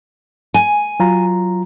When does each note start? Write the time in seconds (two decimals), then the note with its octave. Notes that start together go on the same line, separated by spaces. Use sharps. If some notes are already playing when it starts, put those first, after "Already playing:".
0.54 G#5
1.00 F#3 F4 A#5